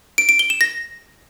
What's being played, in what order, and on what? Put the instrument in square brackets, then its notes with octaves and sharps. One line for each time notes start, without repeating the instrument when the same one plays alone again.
[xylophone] D7
D7
G7
E7
A#6